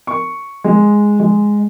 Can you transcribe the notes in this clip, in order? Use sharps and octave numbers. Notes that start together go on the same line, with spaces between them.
C#6
G#3
G#3